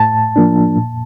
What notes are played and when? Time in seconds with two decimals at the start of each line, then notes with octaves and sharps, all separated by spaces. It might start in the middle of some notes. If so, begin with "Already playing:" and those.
Already playing: A2 A5
0.36 F3 A#3 D4
0.77 A#2